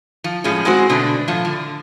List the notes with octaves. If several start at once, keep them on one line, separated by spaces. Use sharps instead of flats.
F3
A2 F3 G#3 C#4
G#3 C4 F#4 C5
B2 D3 A3 D4
A2 F3
D3